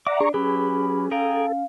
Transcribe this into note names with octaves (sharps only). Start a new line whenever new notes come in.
D5 E5 F#5 A#5 D6
D4 G#4 A#5 C#6
F#3 C#4 G4 G#4 B4 B5
G#4 A4 F5 G5 A#5